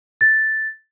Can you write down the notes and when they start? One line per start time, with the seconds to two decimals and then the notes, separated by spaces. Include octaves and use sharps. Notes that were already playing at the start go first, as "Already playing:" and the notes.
0.21 A6